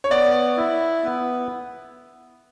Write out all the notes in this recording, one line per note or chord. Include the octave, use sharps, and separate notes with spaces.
C#5
B3 D5
E4
B3